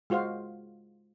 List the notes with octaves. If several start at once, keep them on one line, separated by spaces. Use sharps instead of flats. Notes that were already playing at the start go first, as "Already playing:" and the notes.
G#3 F4 F#4 C5 F5